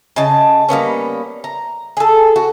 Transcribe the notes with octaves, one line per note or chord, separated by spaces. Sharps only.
C#3 D#5 A5
G3 A#3 B3 C#4
A#5
G#4 A4
F#4